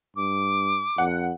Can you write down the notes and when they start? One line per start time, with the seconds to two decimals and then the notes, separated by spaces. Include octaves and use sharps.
0.16 G2 D6
0.98 F2 F#5